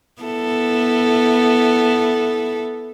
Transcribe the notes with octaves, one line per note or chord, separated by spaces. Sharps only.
B3 E4 A4